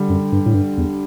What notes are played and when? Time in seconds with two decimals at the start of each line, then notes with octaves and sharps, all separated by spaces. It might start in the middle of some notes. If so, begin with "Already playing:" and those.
Already playing: D3 G3
0.10 F#2
0.32 G2
0.46 A2
0.54 G2
0.78 E2